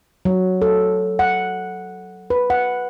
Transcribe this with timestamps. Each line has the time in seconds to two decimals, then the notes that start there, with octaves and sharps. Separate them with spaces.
0.25 F#3
0.62 A4
1.19 F#5
2.30 B4
2.50 F#5